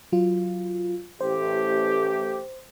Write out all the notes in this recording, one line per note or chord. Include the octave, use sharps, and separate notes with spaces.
F#3 F4
A1 A3 G4 C5